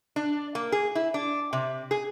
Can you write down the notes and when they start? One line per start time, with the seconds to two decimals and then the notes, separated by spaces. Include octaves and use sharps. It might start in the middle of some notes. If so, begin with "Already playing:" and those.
0.16 D4
0.55 A#3
0.72 G#4
0.95 E4
1.14 D4
1.53 C3
1.91 G#4